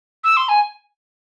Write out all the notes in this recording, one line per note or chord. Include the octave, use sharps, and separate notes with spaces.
E6
C6
G#5